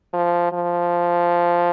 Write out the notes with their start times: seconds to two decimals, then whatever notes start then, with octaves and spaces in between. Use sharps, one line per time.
0.13 F3
0.52 F3